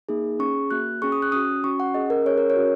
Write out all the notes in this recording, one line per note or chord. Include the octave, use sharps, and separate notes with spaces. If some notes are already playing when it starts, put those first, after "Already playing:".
A#3 D#4 G#4
C#4 G#4 C#6
A#3 F#4 F#6
C#4 G#4 C#6
D#6
F#6
C#4 F#4 D#6
C#4 F#4 C#6
F#5
C#4 G#4 D#5
A#4
C#4 G#4 C#5
A#4
C#5
C#4 F#4